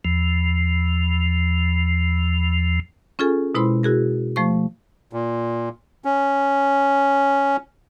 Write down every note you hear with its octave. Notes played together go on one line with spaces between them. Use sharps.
E2 F3
C#4 F4 G#4 A4 G#5
B2 G#3 E4 C5 B5 C6
E4 F#4 G#4 A#4
F3 A3 C5 C#6
A#2
C#4